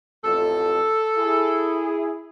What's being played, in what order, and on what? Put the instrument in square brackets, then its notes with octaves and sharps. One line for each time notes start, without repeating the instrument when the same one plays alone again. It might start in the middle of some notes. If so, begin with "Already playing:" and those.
[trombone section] A1 F2 [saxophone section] A4
[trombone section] E4 G#4